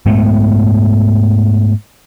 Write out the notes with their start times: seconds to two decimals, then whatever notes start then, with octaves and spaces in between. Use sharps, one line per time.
0.06 G#2 G#3 A3 B3